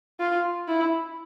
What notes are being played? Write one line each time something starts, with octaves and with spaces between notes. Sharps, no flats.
F4
E4